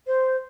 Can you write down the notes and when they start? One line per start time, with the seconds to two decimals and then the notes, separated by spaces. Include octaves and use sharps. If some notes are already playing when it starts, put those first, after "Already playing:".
0.07 C5